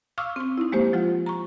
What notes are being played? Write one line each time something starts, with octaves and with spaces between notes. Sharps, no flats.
F5 C#6 D6 E6 F6
C4 C#6
D#4 E4
F3 G#3 A#3 G4 C5
F3 G#3 F4 F#5
A#5 C#6